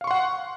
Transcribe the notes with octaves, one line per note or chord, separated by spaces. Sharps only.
F5 F#5 C6 C#6